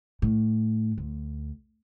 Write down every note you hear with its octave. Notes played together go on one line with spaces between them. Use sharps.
A2
D2